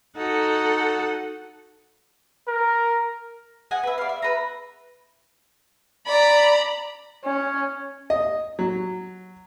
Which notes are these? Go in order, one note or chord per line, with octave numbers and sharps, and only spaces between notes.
D#4 F#4 A4 F#5
A#4
D#5 F#5 G#5
B4 E5
D5 F5
E5
B4 A#5
D5 A#5 B5
C#4
D#5
F#3